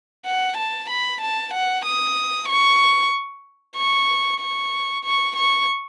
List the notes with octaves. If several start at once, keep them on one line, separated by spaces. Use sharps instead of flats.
F#5
A5
B5
A5
F#5
D#6
C#6
C#6
C#6
C#6
C#6